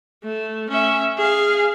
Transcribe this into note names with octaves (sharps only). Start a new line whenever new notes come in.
A3
C#4 E5
G#4 F5